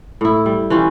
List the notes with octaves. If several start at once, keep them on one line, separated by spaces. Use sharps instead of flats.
A2 E4
G3
E3 C#4 F4 G4